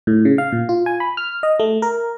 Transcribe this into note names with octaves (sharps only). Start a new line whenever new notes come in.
A2
C#3
F5
A#2
F4
G#5
B5
F6
D#5
A3
A#4